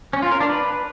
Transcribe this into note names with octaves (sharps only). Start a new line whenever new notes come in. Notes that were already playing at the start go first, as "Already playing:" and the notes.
C#4
F4
A#4
D4
B4